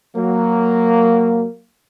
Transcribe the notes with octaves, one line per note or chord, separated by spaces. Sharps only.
F#3 A#3